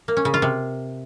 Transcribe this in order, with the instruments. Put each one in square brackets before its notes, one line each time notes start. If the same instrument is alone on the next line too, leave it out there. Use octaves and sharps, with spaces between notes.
[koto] A#3
C#4
C#3
F4
C3